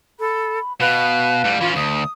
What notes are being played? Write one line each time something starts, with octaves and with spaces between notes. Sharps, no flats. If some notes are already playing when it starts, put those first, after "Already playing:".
A4 B5
B2 B4 F5
A2 G3
E3 C#4 F4
D2 D#6